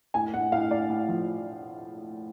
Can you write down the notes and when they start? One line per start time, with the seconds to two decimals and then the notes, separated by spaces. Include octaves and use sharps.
0.14 A2 G#5
0.34 A2 F#5
0.52 A2 F5
0.71 A2 D5
0.90 A2
1.09 F3